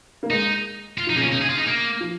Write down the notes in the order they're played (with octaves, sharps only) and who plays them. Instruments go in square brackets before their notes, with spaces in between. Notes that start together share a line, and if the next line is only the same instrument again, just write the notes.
[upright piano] A#3
[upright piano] G#3 [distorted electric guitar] D#4
[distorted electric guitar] F4
[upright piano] F3
[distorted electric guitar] D#4
[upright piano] C#3 [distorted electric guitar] A#3
[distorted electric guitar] C#4
[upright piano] A#2
[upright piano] C#3 [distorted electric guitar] D#4
[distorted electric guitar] G#4
F4
D#4
A#3
[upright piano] F3